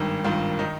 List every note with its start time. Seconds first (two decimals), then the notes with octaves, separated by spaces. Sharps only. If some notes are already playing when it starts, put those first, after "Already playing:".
Already playing: G#1 G2 D#3
0.24 G#1 G2 D#3 F4
0.59 D#3 D#4